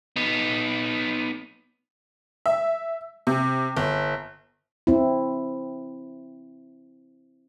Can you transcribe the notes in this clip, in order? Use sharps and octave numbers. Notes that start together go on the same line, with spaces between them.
B3 D#4
E5
C3
G1
C4 E4